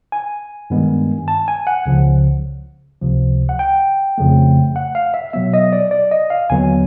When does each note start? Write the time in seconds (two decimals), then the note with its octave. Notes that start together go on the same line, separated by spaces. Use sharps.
0.12 G#5
0.70 G2 D#3 G#3 B3
1.28 A5
1.48 G#5
1.67 F#5
1.86 C#2 C#3 F3
3.01 C#2 C3 F3
3.49 F#5
3.59 G5
4.18 F2 C#3 F3 A3
4.76 F#5
4.95 F5
5.14 E5
5.33 B2 F#3 B3 E5
5.54 D#5
5.73 D5
5.91 D5
6.11 D#5
6.30 F5
6.50 D#2 D3 F#3 B3 G#5